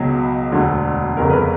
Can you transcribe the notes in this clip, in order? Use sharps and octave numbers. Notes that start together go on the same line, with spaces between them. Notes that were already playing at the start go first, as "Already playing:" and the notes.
Already playing: C#2 B2 F#3
E1 D2 D3
G1 F2 C#3 A#4
B4